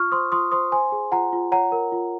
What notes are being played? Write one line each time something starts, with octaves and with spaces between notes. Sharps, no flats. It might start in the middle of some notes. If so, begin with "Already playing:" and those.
Already playing: F4 C#6 F6
C5 C6 D#6
F4 C6 D#6
C5 C6 D#6
C5 G#5 C6
G#4
F4 F#5 A#5
F4
C#5 F#5 A#5
A#4
F4